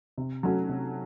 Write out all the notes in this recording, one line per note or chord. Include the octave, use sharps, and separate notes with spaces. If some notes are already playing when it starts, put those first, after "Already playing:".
C3
F#3 A3 C#4 F#4
C3